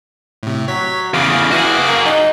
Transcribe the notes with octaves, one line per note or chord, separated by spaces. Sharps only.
A2 C3
F#3 C#5 B6
E2 C#3 G#4 F5 D6
E3 F#4 G#4
A#3
D#4